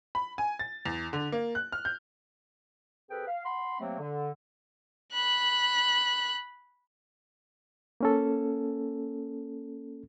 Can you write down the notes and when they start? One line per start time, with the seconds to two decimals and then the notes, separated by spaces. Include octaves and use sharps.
0.15 B5
0.38 G#5
0.59 A6
0.86 E2
1.13 D3
1.32 A#3
1.55 F#6
1.72 F6
1.85 G6
3.10 C3 G#4 A4 B4 G5
3.28 F5
3.45 F#5 B5 C6
3.81 C3 F#3 A3 A#3 C4
4.00 D3
5.13 B5 F#6
8.01 A#3 C#4 A4